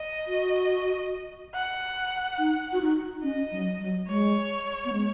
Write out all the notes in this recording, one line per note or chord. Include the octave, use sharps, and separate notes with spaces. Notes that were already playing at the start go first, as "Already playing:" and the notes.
Already playing: D#5
F#4
F#5
D#4
F#4
D#4
C#4 D#5
F#3
F#3
G#3 C#5
B3
G#3